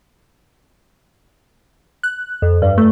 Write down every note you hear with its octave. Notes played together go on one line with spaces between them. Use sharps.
F#6
F2
G2
A3